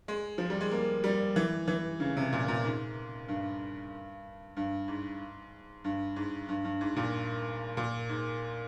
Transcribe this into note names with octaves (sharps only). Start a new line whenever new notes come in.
G#3
F3
G3
G#3
A#3
G3
E3
E3
C#3
C3
A#2
A#2
G#2
G2
G2
G#2
G2
G#2
G2
G2
G#2
A#2
A#2
G#2